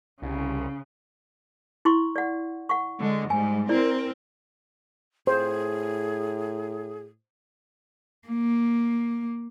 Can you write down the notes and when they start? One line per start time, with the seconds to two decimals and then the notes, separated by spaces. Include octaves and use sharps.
0.22 C2 C#3
1.85 E4 C6 C#6
2.16 D5 F#5
2.69 F#5 C#6
3.00 D3 G#3
3.30 G#2 G3 G#5
3.69 C4 E4 A#4 D5
5.27 A2 G#4 C5
8.29 A#3